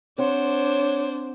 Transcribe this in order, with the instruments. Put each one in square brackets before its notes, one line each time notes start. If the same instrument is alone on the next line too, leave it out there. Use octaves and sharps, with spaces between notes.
[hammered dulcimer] C4 F#5 [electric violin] D4 C5 [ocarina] C#5